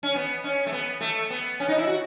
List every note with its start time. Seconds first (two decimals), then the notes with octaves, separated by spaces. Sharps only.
0.03 C#4
0.15 B3
0.44 C#4
0.66 A3
0.72 B3
1.01 A3
1.30 B3
1.60 C#4
1.68 D#4
1.78 E4
1.87 F#4